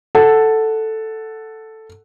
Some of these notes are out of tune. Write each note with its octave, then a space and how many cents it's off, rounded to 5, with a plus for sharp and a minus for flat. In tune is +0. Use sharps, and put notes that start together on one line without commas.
A4 +0 F#5 +0